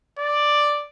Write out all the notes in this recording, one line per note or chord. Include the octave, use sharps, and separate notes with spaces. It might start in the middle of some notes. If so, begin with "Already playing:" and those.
D5